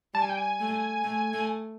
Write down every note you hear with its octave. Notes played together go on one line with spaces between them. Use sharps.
G3 A5
G#5
G5
G#5
A3
A3
A3